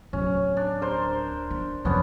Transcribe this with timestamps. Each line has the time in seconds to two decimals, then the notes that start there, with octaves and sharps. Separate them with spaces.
0.13 D1 C#4
0.57 D4
0.81 A#4 C5
1.51 D4
1.85 F2 F3 B3 C#4 D4